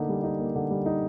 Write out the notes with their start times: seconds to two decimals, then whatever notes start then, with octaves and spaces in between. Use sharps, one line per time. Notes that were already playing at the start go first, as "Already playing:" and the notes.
Already playing: D3 A#3 D#4
0.09 G3
0.24 D#4
0.39 A#3
0.55 D3
0.71 G3
0.86 D#4